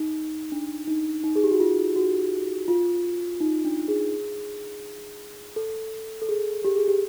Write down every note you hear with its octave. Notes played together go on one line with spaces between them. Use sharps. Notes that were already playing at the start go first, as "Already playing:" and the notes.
Already playing: D#4
D4
D#4
D#4
G#4
G4
F#4
F4
F#4
F4
D#4
D4
G#4
A4
A4
G#4
G4
G#4
G4